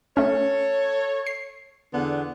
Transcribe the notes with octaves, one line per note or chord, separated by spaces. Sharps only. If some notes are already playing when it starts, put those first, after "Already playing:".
A3 C#4 A4 C#5
C7
E2 D3 B3